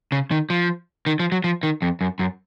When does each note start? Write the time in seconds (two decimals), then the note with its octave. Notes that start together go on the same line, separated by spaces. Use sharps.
0.12 C#3
0.31 D#3
0.50 F3
1.06 D#3
1.20 F3
1.32 F#3
1.44 F3
1.63 D#3
1.82 F2
2.01 F#2
2.19 F#2